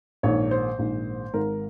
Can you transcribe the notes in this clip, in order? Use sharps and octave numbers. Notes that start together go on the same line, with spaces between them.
A#1 G#2 D#3 C#5
C5
A#1 G#2 D#3
G#1 G#2 D#3 A#4